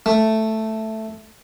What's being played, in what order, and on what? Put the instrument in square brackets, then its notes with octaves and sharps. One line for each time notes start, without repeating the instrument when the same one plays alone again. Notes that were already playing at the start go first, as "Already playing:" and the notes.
[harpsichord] A3